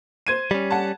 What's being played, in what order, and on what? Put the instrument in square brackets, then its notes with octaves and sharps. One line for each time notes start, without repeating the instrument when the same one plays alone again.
[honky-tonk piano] C5 G#6 D#7
[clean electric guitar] G3 C#4
[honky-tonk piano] F#5 A5